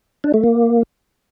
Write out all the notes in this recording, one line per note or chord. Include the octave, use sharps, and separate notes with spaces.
D4
A3
A#3